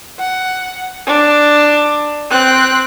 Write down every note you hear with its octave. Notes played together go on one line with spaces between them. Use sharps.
F#5
D4
C4 F#6